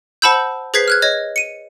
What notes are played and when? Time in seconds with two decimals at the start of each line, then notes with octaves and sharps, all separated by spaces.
0.22 C5 F#5 A5 B5 E6 G6
0.74 G#4 B4 C5 G#6 B6 C7
0.88 F6 F#6 G#6
1.02 C#5 D#5 G#6
1.36 C#7 D#7